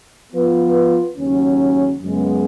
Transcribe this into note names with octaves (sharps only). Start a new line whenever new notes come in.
F3 B3 F4 B4
D#2 C#3 F#3 C#4
F#2 C#3 G#3 B3